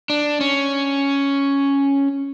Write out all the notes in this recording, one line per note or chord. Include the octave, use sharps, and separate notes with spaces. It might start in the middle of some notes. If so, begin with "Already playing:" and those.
D4
C#4